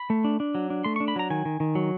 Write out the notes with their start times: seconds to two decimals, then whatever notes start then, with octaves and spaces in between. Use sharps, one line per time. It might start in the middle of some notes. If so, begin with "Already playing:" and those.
Already playing: B5
0.10 A3
0.24 D4
0.40 D4
0.55 F#3
0.70 D4
0.84 A3 C6
0.96 C#6
1.00 D4
1.08 B5
1.16 F#3 A#5
1.30 D#3 G#5
1.45 D#3
1.60 D#3
1.75 F#3